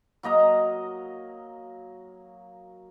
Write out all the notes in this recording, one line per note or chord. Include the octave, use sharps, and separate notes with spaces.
F#3 A#3 D#5 A#5